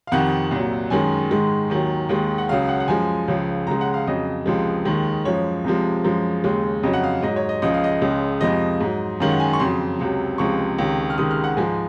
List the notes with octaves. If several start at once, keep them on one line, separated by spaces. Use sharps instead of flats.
F5
F2 C3 D#3 F#5
C2 A#2 F#3
F#2 D#3 G#3 G#5
G#2 D#3 G#3
D#2 D#3 F#3
D#2 D#3 G#3
F#5
C#2 C#3 F#3 F5
F#5
F#5
F#2 F3 G#3 G#5
C#2 C#3 F3
C#2 C#3 G#3 A#5
F#5
F5
F2 C#3 F#3 D#5
C#2 C3 F3 G#3
D#2 D#3 G#3
F#2 F3 G#3 C#5
C2 C3 F3 G#3
F#2 F3 G#3
D#2 C#3 G#3
F2 C#3 F#3 D#5
F#5
F5
G#2 F#3 D#5
C#5
D#5
C#2 C#3 F3 D#5
F5
D#5
C#2 C#3 G#3
F2 C3 F3 G#3 D#5
G#2 F#3
F#2 D#3 G#3 F5
F#5
G#5
C#6
F2 C#3 F#3 C6
C#2 C3 F#3
C#2 C3 F3 G#3 C#6
C#2 C3 D#3
F6
C#2 C3 D#3 G#3 D#6
F6
F#5
G#2 F3 G#3 G#5